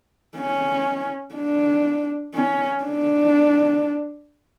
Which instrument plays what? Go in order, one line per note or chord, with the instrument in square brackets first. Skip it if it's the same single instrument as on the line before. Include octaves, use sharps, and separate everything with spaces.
[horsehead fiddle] C#4
D4
C#4
D4